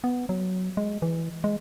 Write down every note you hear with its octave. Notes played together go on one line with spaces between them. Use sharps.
B3
F#3
G#3
E3
G#3